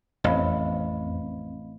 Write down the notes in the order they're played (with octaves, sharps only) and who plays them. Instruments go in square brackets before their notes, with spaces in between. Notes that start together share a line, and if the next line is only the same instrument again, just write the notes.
[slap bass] A1 [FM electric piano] F2 C4 [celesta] D#5 F5 B5